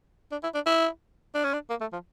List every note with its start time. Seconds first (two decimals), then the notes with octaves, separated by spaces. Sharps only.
0.32 D4
0.43 E4
0.55 D4
0.66 E4
1.35 D4
1.44 C#4
1.53 D4
1.70 A#3
1.81 A3
1.93 F3